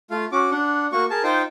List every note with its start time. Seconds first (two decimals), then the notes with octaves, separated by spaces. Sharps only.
0.10 A3 F4 F5
0.32 C#4 F#4 D6
0.51 D4 F#5
0.92 A#3 F#4 C#6
1.10 G#4 A#4 A5
1.23 D#4 F4 C5 G5